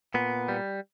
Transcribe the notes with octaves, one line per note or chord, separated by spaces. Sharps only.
A#2 B3
G3